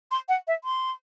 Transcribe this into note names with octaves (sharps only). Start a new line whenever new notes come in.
C6
F#5
E5
C6